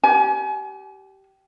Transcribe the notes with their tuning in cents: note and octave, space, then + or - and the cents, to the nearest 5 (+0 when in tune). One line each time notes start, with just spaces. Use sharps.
G4 -20 G#5 +35